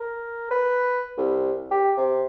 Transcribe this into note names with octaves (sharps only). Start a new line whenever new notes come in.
A#4
B4
C2
G4
C3